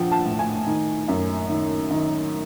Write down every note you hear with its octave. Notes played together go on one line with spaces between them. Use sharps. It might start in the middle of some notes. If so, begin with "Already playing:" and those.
Already playing: A#1 F3 F#5 G5
A5
A2
G#5
D#3
F#2
D#3
D#3